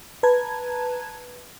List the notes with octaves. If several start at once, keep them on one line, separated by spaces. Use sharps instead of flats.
B4 A5 A#5 G#6